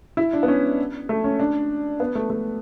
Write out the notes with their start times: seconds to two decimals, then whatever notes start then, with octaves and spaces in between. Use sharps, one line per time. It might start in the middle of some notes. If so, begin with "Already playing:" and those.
0.17 E4
0.33 D4
0.43 B3
0.48 C#4
1.09 A3
1.24 C#4
1.39 D4
2.00 B3
2.15 A3
2.30 A3